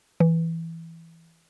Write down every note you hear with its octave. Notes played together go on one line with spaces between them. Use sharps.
E3